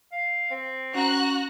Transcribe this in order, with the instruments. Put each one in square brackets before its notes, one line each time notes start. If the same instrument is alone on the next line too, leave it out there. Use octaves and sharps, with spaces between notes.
[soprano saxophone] F5
C4
[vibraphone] C#4 [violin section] F#4 A#5 F#6